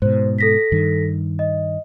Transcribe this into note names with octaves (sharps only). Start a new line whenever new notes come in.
G#2 B2 C5
A4 A#6 B6
G2 D#3
D#5